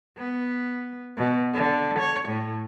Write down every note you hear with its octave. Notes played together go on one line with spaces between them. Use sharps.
B3
B2
D3
C#5
A2